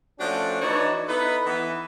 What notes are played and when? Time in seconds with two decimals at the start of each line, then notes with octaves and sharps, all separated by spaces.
0.19 F3 A3 C#4 D4 F#4
0.61 E3 D4 D#4 F#4 C#5 D5
1.08 B3 D#4 E4 A4 B4
1.46 E3 B3